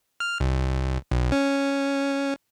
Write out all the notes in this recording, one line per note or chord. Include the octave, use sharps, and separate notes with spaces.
F6
C2
B1
C#4